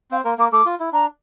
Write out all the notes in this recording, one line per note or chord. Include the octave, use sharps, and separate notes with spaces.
C4 C5 F5
A#3 A#4 C6
A#3 A#4 D6
A3 A4 D6
F4
E4
D4 A#5